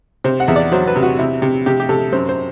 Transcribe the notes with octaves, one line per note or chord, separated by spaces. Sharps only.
C3 C5
F#5
E2 E5
D5
F#3 C5
B4
C3
F#4
C3 E4
C3
C3 G4
G4
C3 A4
F#2 C5
C5